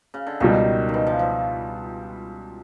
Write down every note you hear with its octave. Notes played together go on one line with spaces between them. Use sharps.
C#3
D3
C#2 B2 D#3 G3
D#3
E3
F3
F3